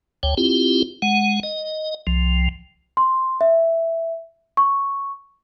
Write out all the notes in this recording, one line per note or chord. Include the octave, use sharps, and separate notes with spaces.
D2 C#5 G5
C4 E4 F4 G4
G#3 F#5
D#5
C2 F3
C6
E5
C#6